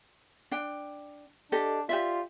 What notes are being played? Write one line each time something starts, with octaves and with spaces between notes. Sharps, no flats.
D4 G5
D4 G4 A4 D#5
F4 G4 D5 E5